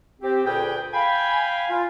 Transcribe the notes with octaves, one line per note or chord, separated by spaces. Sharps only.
C4 G4
D2 A#2 G#4 B4 D5 G5
F5 G5 G#5 B5
F4